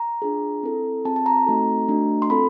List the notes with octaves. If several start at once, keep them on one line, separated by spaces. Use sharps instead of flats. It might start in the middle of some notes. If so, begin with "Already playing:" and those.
Already playing: A#5
D4 F4 G#4
C4 E4 A4
C4 F4 G#4 A5
A5
A#5
A3 C4 D#4 F#4 A4
A3 D4 F#4
C6
C4 F4 A4 B5